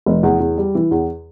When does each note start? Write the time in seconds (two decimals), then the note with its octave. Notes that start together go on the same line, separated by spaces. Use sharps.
0.06 F1
0.23 E2
0.40 E2
0.58 G3
0.75 E3
0.91 E2